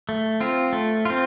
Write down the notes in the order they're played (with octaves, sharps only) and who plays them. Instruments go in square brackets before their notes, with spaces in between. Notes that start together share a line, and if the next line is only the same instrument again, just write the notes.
[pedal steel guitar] A3
C4 F4
A3
C4 F4